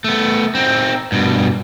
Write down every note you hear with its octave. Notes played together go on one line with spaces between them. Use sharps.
A3 B3
C4 D#4
G2 B2